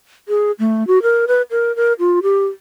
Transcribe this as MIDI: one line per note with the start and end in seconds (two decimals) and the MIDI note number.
0.28 0.52 68
0.59 0.86 57
0.87 1.02 66
1.02 1.25 70
1.28 1.42 71
1.51 1.75 70
1.76 1.93 70
1.99 2.19 65
2.23 2.46 67